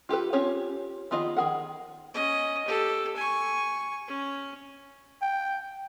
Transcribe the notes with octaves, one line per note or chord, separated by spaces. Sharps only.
F4 G4 A4 B4
C4 C#4 F4 G4 C#5
D#3 B3 F4 G#4 D#5
D#3 F#3 G#4 A#4 F#5
C#4 D#5
G4 A4
G#5 C#6
C#4
G5